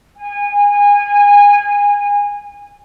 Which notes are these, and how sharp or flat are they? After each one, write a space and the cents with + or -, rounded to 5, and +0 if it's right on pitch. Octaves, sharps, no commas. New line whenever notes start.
G#5 -25